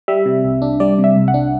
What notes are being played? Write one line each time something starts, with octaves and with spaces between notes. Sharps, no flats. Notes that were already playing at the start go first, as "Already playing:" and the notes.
G3 E5
C3
C2
D4
G3 D5
C3
E5
C2
F#5
D4